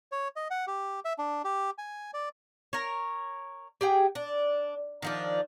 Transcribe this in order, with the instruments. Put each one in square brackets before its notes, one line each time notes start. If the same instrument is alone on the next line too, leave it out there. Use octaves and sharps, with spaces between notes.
[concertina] C#5
D#5
F#5
G4
E5
D4
G4
G#5
D5
[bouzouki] A#4 C#5
G4 G#4 G5
D4
D#3 F3 D4